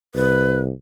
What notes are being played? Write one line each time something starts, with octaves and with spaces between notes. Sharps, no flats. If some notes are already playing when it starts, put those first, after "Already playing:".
C2 B4